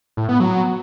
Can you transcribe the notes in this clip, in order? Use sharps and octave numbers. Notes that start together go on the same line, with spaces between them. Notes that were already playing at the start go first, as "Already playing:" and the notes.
A2
B3
F#3